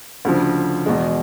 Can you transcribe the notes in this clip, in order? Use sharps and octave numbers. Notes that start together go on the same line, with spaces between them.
D2 C#3 F3
E2 B2 G#3